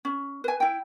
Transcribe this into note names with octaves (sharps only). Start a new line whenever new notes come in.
C#4
B4 G#5
E4 G5